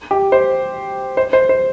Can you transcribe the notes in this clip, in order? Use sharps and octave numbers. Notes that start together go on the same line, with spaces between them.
G4
C5
C5
C5
C5